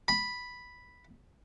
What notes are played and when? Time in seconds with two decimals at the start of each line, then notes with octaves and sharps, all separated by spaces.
0.08 B5